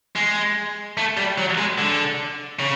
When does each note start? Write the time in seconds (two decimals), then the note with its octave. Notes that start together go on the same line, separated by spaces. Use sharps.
0.16 G#3
0.97 A3
1.17 G3
1.38 F#3
1.58 G#3
1.78 D3
2.60 C#3